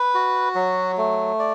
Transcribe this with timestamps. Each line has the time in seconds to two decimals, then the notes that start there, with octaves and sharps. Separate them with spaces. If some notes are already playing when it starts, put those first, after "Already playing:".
Already playing: B4
0.14 F#4
0.55 F#3
0.97 A3
1.39 D5